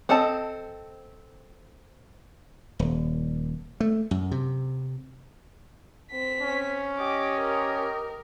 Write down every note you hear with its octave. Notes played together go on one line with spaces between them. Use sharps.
C4 A4 D#5 A5
D#1
A3
F#2
C3
C4 B6
C#4
G4 D#5 D6
A#4